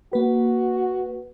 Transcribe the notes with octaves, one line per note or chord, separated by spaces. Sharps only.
A#3 F#4 B4